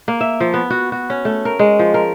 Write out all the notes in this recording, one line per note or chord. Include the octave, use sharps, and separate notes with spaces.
A#3
E5
F3
B3
F#4
F#4
C#4
A3
A#4
G#3
F3
A#4